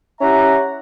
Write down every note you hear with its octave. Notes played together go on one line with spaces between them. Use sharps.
C#4 E4 G4 E5 F#5 A#5